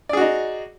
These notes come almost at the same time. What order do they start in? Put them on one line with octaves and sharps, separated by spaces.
D5 G#4 F#4 D#4